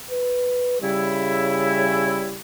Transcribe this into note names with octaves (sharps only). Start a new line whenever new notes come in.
B4
C#3 G3 E4